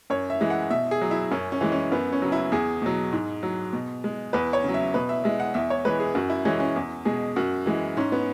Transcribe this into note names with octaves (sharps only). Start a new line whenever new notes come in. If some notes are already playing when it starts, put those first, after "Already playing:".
F#2 C#5
E5
E3 G#3
F#5
B2 E5
G#4
F#3
E4
F#2 C#4
C#4
E3 G#3
C#4
F#2 B3
C#4
C#3 F#3
E4
E2 G#4
B2 F#3
G#2
F#3
B2
G#3
E2 B4
C#5
C#3 F#3
E5
B2 B4
E5
G#3 E5
F#5
E2 E5
C#5
E3 G#3 B4
G#4
F#2 F#4
E4
E3 G#3 C#4
C#4
E2
B2 G#3 G#4
F#2 F#4
E3 G#3
G#2 C#4
B3